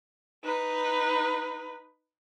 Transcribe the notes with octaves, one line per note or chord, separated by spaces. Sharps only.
D#4 B4